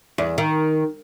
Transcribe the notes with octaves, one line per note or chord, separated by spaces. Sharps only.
E2
D#3